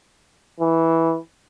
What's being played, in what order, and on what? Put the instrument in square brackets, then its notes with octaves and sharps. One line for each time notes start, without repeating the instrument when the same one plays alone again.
[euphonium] E3